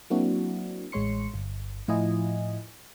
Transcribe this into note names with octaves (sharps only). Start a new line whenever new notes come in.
F#3 A#3 C4 D4 E4 F#4
A1 G#3 C#5 C6 C#7
G1
A2 F3 E4 F4 D#5 G#5